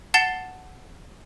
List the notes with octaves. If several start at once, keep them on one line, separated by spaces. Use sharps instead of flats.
F#5 A5 A6 C7 E7 G7